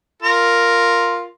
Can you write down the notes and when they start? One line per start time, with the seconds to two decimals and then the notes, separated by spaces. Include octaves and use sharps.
0.22 F4 A#4